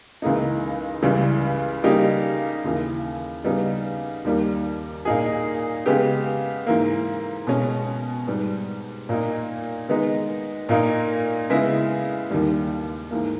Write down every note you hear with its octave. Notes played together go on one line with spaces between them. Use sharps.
C#2 C#3 E3 A#3 D#4
C#2 C#3 E3 G3
C#3 G3 A#3 D#4 G4
D#2 C#3 E3
C#3 G3 B3 D#4
D#2 D#3 G3 A#3
A#2 A#3 D#4 G#4
C#3 G#3 B3 G4
G#2 E3 A#3
B2 G#3 C#4
G#2 G3 B3 G4
A#2 A#3 D#4
D#3 G#3 B3 D#4
A#2 A#3 D#4
C#3 G#3 B3 E4
D#2 D#3 G3
G#2 E3 A#3